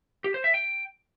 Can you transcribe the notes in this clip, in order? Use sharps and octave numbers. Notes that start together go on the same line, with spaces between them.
G4
C5
E5
G5